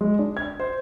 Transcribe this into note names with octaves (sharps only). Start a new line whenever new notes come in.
G#3
D4
G#6
C5